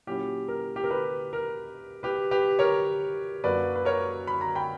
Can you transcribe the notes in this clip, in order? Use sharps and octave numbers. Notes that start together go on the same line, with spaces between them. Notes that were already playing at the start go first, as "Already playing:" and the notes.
A#2 F#3 C#4 E4 G4
A#4
G4
A#4
G4 B4
A#4
G4 B4
G4 B4
A#4 C#5
F#2 D3 A#3 B4 D5
B4
A#4 C#5
B5
A#5
G5 B5